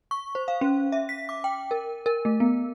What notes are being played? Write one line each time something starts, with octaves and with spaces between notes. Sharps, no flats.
C#6
C5
F5
C#4
E5
B6
D6
G5
A#4
A#4
A3
B3